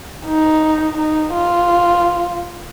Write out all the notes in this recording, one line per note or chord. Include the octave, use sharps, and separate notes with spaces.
D#4
D#4
F4